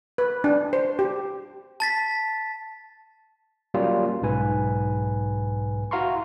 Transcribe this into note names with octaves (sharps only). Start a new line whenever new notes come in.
B4
D4
C5
G4
A5 A6 B6
F#3 G3 A#3 C#4 F4 G4
B1 G#2 B4 G#5
E4 F#4 F5 A#5 C6 C#6